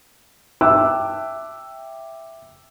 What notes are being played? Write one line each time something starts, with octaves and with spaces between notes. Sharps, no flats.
E5 G5 A5 D6 E6 F#6